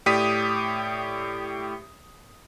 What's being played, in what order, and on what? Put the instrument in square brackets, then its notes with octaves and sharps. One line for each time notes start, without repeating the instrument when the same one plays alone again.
[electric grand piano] A2 G4 D5 D#6 B6 D#7